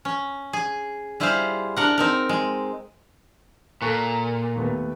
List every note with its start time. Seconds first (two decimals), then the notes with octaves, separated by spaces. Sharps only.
0.05 C#4
0.53 G#4
1.20 G3 E4 F4 G#4 C5 F5
1.77 D4 A#4 F#5
1.98 C4 D#4 A#4
2.29 G#3
3.82 A#2 A4 C#6 F#6
4.56 D#2 A3 B3